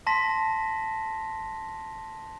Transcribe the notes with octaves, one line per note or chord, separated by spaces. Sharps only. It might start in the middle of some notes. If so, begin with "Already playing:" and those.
A5 C6 A#6 B6